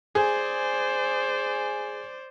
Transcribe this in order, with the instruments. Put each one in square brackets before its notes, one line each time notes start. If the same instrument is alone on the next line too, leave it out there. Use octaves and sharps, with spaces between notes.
[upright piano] G#4 [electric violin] C5 D5